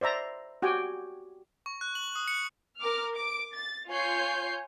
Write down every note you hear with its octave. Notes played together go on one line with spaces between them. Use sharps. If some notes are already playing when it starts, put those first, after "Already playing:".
C5 D5 E5 A#5
F#4 G4 G5 G#5
C#6
F#6
F#7
D#6
C#7
A#4 D6 F6
D6 D7
A6
F4 C#5 G#5 G6 C7